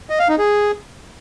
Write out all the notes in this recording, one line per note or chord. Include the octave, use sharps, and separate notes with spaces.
D#5
F5
D#4
G#4